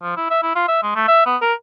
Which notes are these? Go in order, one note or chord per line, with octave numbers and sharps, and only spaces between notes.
F3
E4
E5
E4
F4
E5
G#3
A3
E5
B3
A#4